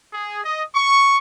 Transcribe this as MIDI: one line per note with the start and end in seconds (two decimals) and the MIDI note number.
0.12 0.40 68
0.43 0.62 75
0.74 1.16 85